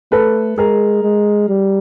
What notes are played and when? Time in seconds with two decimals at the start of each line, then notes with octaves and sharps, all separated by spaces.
0.12 A3 A4 B4
0.58 G#3 G#4 A#4
1.03 G#3
1.49 G3